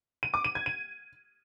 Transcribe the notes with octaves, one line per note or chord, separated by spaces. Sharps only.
D#7
D6
D#7
G#6
D#7